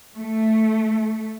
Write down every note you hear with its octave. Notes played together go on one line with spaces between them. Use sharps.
A3